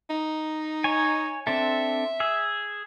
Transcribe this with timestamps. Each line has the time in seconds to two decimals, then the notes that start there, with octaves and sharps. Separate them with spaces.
0.10 D#4
0.84 C#5 G#5
1.47 C4 D4 A4 E5
2.20 G#4 E6